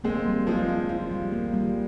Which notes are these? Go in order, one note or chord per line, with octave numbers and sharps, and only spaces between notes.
G#3 A#3 C4
G3
F3 G#3 F4
F4
F4
G3
A#3
G3